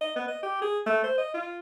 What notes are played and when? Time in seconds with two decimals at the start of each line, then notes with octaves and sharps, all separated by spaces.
0.01 D#5
0.16 B3
0.28 D#5
0.43 G4
0.62 G#4
0.86 A3
1.04 C5
1.18 D#5
1.34 F4